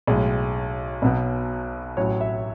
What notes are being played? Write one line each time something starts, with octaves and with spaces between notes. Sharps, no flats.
B1 A2 G#3
B1 B2 F#3
A1 A2 F#3 C#5
E5